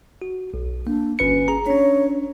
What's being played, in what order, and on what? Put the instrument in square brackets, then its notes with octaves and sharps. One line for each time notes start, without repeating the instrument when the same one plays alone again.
[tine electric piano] F#4
B1
[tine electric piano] A#3 [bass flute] D4
[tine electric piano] G1 B4 C#7 [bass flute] C#4
[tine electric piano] G#4 A#5
[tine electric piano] C#4 D4 [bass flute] C#5